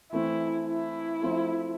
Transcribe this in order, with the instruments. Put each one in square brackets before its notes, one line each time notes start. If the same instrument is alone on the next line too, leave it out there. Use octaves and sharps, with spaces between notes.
[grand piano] E3 A3 C4 [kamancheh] E4
[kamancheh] E4
[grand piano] F3 A3 C4 F4 A4